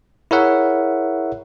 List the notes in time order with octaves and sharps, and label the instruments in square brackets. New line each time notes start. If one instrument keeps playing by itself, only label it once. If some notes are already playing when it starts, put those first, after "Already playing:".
[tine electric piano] E4 G#4 A#4 C#5 E5 F#5